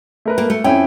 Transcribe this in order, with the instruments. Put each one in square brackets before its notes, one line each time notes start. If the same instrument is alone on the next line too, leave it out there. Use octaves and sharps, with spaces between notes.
[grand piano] A3 A#4 B4
[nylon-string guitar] A#3
A3
[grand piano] F2 E4 G5 [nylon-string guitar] C#4